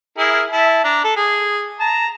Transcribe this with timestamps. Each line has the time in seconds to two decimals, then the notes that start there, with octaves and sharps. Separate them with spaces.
0.18 E4 G#4 A#4
0.51 E4 E5 A5
0.84 D4 A#5
1.04 A4
1.17 G#4
1.80 A5 A#5